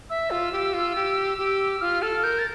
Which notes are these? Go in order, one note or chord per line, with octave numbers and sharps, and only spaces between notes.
E5 E6
F4
G4
F4
G4
G4
F4 F6
A4 F6
A#4 G6
A6